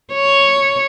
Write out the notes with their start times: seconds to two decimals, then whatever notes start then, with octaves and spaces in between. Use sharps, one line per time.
0.14 C#5